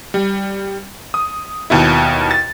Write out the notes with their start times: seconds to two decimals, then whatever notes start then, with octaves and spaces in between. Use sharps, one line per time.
0.14 G3
1.14 D#6
1.70 D#2 B2 E4
2.31 A6